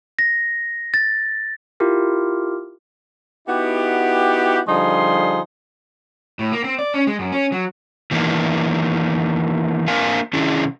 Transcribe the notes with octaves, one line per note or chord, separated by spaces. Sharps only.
A#6
A6
E4 F4 G4 A#4
B3 D#4 E4 F#4 G4
D3 F3 G3 D#4 G#4 C6
A2
A#3
C4
D5
C#4
G#3
F#2
C#4
F#3
D#3 E3 A#3 B3 D4
A#3 C4 D4 A#4 F5 G#5
C3 D#3 C#4 D4 E4 G#4